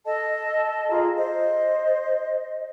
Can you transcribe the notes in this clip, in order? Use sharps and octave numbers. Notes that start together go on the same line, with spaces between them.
A4 D#5 A5
F4 G#4 A#5
C5 D#5